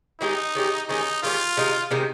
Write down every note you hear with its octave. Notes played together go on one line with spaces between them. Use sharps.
D#3 G#3 C#4 D#4 G4
D#3 G#3 C#4 G4
D#3 G#3 C#4 D#4 G4
D#3 G#3 C#4 F4 G4
C3 D#3 G#3 D#4
C3 D#3 G#3 D#4